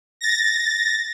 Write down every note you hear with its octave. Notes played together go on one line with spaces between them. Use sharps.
A6 A#6